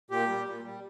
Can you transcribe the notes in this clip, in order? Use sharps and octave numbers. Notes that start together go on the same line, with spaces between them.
A#2 G4
G3
A#2
G3